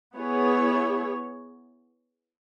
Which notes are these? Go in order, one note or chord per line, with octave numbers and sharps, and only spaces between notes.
B3 E4 G#4 C#5